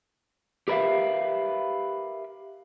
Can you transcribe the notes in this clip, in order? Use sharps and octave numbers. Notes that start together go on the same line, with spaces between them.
G4 A#4 B4 C#5 E5 F5